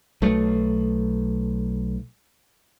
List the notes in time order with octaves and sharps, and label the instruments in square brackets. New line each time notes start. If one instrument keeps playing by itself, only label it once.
[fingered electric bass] B1 A3